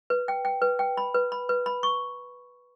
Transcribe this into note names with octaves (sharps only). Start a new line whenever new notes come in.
B4
G5
G5
B4
G5
B5
B4
B5
B4
B5
C#6